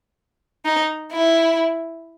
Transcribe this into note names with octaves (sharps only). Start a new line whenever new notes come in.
D#4
E4